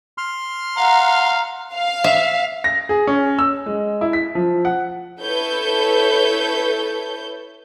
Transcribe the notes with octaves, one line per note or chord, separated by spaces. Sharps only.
C6 F6
F5 F#5 A#5
F5
E5
A#6
G#4
C#4
E6
G#3
E4
B6
F3
F#5
E4 A4 B4 C#5 G6